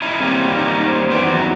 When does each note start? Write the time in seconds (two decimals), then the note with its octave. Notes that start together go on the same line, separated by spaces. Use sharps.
0.02 C#4 D#4 E4
0.20 G3 A#3 C4 C#4
0.57 D#4
0.86 C5
1.10 E3 B3 C5 D5
1.23 E2 F#3 D#4